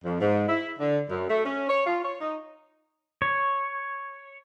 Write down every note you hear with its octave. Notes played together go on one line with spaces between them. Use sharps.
F2
G#2
E4
D3
F#2
A3
C#4
C#5
F4
C#5
D#4
C#5